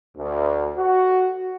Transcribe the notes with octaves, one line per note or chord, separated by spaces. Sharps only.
D2
F#4